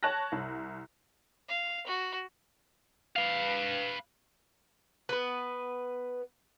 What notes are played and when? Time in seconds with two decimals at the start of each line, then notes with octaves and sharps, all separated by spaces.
0.03 C#5 A5 F#6 A#6
0.32 C2
1.49 F5
1.87 F#4
3.16 B4 F5
5.09 B3 B4